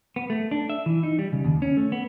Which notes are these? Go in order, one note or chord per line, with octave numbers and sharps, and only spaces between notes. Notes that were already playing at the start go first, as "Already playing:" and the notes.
B3
A3
D4
E5
E3
D#4
G3
C#3
D#2
C#4
A3
B3